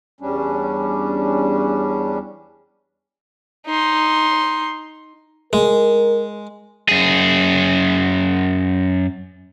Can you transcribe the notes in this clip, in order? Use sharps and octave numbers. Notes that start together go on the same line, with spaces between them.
E2 G3 C#4 D4
D#4 C6
G#3 A#4
F#2 G#4